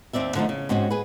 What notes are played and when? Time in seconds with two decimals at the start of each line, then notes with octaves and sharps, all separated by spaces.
0.13 D#2 A#2 C4 D5 E5
0.35 D3 F3 G3 A3 D#4
0.49 C#3
0.69 G#2 C4 C#4 F#4
0.91 G#4 B4